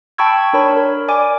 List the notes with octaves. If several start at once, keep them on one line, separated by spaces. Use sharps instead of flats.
G5 A5 B5 C#6 E6 G#6
D4 A#4 C#5 B5
A#4
D5 G#5 D6